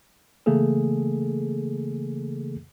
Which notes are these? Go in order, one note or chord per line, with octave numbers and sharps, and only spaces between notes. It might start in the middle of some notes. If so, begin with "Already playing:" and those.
C#3 E3 A3 A#3 G#4 A4